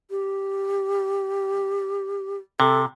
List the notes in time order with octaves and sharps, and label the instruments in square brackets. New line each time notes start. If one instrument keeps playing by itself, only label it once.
[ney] G4
[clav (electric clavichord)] C3 [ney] A4